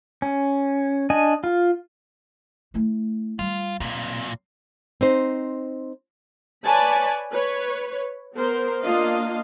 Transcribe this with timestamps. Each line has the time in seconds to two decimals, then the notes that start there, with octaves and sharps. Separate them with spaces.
0.22 C#4
1.10 D4 D#5 G#5
1.44 F4
2.74 A3 E4
3.39 G3 F4
3.80 B1 A#2 C4
5.01 C4 D#4 C5
6.65 B4 C#5 D5 G#5 A5 B5
7.31 B4 C#5
8.34 B3 A#4 C5
8.83 A#3 D4 F4 D#5 F5